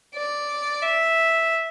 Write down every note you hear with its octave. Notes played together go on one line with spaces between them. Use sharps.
D5
E5